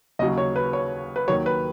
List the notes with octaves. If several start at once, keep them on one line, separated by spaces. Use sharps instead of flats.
D#2 C#3 F#3 D#5
C#5
B4
C#5
B4
D#2 D#3 F#3 C#5
B4